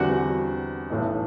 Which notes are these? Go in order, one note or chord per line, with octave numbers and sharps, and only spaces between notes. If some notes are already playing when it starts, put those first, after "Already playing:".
Already playing: E2 D3 G3 C4 F#4 F#5
B1 A2 E3 A3